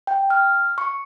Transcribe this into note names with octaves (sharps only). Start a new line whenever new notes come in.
G5
F6
C#6